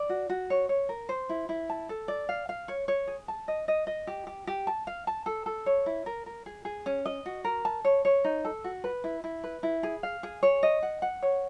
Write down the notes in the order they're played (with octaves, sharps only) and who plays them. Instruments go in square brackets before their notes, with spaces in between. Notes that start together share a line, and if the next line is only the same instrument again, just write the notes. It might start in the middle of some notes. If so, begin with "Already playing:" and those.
Already playing: [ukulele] D5
F#4
F#4
C#5
C#5
A#4
C5
E4
E4
A5
A4
D5
F5
F5
C#5
C#5
G#4
A5
D#5
D#5
D#5
G4
G4
G4
A5
F5
A5
A4
A4
C#5
E4
A#4
A#4
G#4
G#4
C#4
D#5
F#4
A#4
A5
C#5
C#5
D#4
A4
F#4
B4
E4
E4
B4
E4
G#4
F5
G#4
C#5
D#5
F#5
F#5
C#5